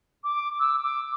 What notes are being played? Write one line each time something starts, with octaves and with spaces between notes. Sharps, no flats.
D6
E6
D6